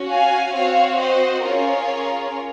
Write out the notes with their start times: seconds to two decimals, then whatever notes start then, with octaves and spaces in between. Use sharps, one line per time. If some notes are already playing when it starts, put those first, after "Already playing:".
Already playing: C#4 F#4
0.09 F5 G#5
0.54 C4 F#4 C#5 F5
0.99 C5 D#5
1.43 C#4 F4 G#4 A#4 C#5